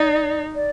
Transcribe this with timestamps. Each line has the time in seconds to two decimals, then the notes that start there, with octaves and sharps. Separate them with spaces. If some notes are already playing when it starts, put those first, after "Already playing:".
Already playing: D#4 D5
0.55 D5